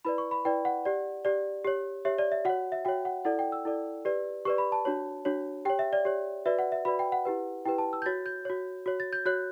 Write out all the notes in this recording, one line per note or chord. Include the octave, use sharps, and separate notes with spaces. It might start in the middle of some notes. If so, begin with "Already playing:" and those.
E4 B4 D5 B5
C#6
B5
E4 B4 D5 G5
F#5
G4 D5
G4 D5
G4 C#5
G4 C#5 E5
D5
E5
F#4 C#5 F#5
E5
F#4 C#5 G5
F#5
E4 A4 D5 F#5
G5
E6
E4 A4 D5
G4 B4 D5
G4 B4 D5 C#6
B5
A5
D4 F#4 C#5
D4 F#4 C#5
G4 C#5 G5
E5
D5
G4 C#5
F#4 B4 D5 E5
F#5
E5
F#4 B4 D5 B5
G5
F#5
E4 G4 B4
E4 G4 B4 G5
A5
E6
G6
F#4 C#5 A6
G6
F#4 C#5
F#4 C#5
A6
G6
F#4 C#5 F#6